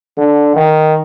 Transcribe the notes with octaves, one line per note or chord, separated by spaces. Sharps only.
D3
D#3